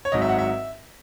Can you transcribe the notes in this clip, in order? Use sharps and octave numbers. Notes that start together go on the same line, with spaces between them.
C#5
G#1 G#2 F#3 D#5
E5
F#5
E5